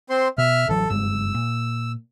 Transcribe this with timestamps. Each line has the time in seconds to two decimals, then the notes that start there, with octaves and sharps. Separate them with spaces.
0.10 C4 C5 C6
0.38 B2 E5 F6
0.69 A1 E3 F#3 A4
0.89 F#1 G2 G#3 E6
1.34 A#2